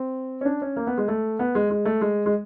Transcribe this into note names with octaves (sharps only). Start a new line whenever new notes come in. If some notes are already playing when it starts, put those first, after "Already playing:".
Already playing: C4
C#4
D4
C#4
A#3
B3
G#3
A3
B3
G#3
G#3
A3
G#3
G#3